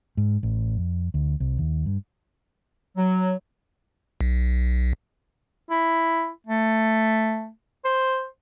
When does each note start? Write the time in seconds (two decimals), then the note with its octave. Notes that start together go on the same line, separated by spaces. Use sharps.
0.17 G#2
0.43 A1
0.76 F2
1.14 D2
1.40 C2
1.58 D#2
1.86 G2
2.97 F#3
4.21 B1
5.70 E4
6.47 A3
7.85 C5